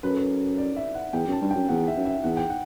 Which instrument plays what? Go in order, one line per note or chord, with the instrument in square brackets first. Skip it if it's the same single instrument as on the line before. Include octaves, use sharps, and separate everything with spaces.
[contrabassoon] F#2 [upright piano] B4
[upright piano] A4
B4
D5
E5
F#5
[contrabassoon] E2 [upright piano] G5
[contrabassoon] F#2
[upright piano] A5
[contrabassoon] G2
[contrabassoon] F#2 [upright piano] G5
[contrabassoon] E2 [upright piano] F#5
[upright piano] E5
[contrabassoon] F#2
[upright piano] E5
[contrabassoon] E2 [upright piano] F#5
[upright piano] G5
F#5